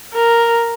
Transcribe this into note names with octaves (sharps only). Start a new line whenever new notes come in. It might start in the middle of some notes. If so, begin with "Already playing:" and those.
A#4